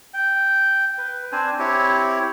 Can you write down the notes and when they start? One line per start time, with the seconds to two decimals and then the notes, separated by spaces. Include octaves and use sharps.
0.14 G5
0.98 B4
1.32 C4 D4 C5 G#5
1.59 C4 E4 G4 C#5